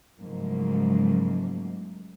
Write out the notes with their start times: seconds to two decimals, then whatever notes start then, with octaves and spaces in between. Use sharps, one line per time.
0.21 G#2 C#3 F3 F#3 A3 A#3